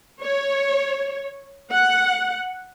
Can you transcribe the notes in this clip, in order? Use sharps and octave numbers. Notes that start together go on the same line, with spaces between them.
C#5
F#5